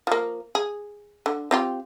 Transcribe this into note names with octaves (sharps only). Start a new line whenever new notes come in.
F3 A#3
G#4
D3
C4 F4 G4